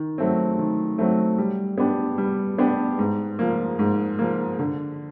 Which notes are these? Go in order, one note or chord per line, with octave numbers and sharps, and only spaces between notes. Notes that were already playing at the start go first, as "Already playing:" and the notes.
Already playing: D#3
F#3 A3 C4
D#3
F#3 A3 C4
G3
B3 D4 G4
G3
B3 D4 G4
G#2
F3 A#3
G#2
F3 A#3
D3